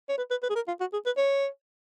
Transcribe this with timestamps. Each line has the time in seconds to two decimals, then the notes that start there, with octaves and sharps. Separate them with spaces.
0.09 C#5
0.18 B4
0.30 B4
0.43 B4
0.50 G#4
0.55 A#4
0.68 F4
0.80 F#4
0.93 G#4
1.06 B4
1.17 C#5